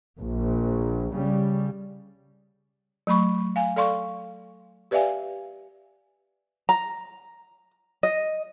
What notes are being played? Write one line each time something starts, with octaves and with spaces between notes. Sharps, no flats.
A#1
C#3 G3
F#3 A3 B5 C#6
F5 G#5
A4 D5 F5 C6 C#6
G4 B4 D5 E5 F5 G#5
A#5
D#5